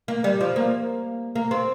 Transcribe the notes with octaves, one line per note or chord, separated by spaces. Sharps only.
A#3
G3
F3
A#3
A#3
C4